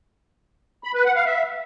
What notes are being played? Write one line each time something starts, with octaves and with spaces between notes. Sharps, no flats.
B5
B4
F#5
F5
E5